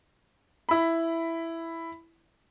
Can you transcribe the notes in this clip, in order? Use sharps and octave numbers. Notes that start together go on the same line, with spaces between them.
E4 B5